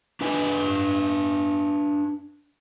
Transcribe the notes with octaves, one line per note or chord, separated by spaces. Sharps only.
D4 B4 G#5